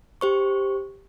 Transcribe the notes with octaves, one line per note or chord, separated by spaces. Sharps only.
G4 C5 C#6